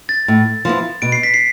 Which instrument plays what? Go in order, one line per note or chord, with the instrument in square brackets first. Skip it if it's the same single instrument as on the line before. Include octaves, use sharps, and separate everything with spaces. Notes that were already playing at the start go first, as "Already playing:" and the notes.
[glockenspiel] A6
[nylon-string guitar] A2
F3 B3 E4
[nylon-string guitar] B2 [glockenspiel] D7
[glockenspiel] C7
B6
C7